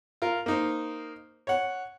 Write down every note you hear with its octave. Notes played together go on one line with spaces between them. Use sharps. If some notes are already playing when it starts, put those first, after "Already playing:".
F4 A#4
A#3 D#4 C5
C#5 F#5